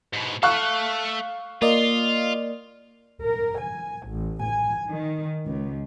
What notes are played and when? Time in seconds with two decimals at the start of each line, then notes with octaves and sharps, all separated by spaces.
0.13 G#2 B2
0.43 A3 A4 F5 C#6 F#6
1.62 A#3 F4 D5 D#5
3.24 A#4
3.60 G#5
4.07 A1
4.44 G#5
4.88 D#3
5.46 C#2